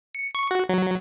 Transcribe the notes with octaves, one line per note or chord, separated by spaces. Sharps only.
C#7
C#6
F#4
F#3